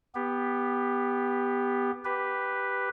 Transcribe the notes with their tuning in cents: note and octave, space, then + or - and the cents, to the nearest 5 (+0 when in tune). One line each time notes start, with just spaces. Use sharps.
B3 +0 G4 +15
G4 +0 B4 +0